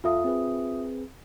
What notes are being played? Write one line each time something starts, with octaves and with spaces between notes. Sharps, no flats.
E2 F4 A4 E5 F5 D#6
C4 G#4 B4